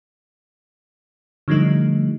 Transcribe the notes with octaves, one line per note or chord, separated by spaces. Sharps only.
D3 F3 G3 A3 D#4